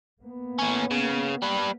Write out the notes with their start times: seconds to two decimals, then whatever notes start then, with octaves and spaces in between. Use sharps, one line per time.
0.21 A#3 B3
0.59 A2 C#4
0.91 C#3
1.42 G3 B4